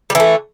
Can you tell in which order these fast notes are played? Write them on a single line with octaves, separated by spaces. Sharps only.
G3 E3 A3